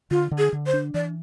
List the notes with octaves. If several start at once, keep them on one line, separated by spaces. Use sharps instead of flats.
D3 F4
D3
G#4
D3
C5
D4
E3 D5